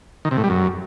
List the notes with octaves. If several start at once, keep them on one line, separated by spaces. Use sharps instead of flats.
D#3
C3
A2
G3
F#2